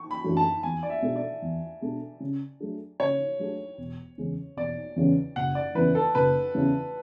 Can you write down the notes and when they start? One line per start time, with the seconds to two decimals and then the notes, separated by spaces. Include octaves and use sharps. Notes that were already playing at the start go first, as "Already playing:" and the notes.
Already playing: C#6
0.11 B5
0.24 F#2 E3 A3 D4
0.37 A5
0.63 E2 G#5
0.83 D5
0.90 E5
1.02 B2 G#3 D4 A4
1.16 D5
1.42 E2
1.81 B2 G#3 D4 A4
2.20 C#3
2.60 F#3 A3 D4 G#4
3.00 C#3 C#5
3.39 F#3 A3 D4 G#4
3.78 E1
4.18 E2 C#3 G#3 C#4
4.57 E1 D5
4.96 E2 C#3 G#3 C#4
5.36 F#1 F#5
5.55 D5
5.75 E2 C#3 E3 B4
5.95 A4
6.15 F#1 B4
6.55 E2 C#3 E3